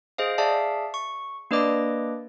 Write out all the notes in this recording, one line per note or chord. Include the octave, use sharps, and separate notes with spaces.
G#4 C5 D#5 F5
G#4 D5 E5 F5 A5
C#6
A#3 D4 B4 D5 D#5 D6